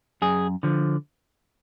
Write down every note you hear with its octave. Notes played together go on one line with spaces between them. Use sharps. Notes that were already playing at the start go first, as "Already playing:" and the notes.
F#2 G#4
D3 F3